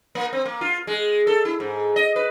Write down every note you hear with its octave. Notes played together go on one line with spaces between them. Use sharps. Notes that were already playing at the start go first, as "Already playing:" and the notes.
A#3
C4
A#3
F4
G#3
A4
E4
G#2
D#5
B4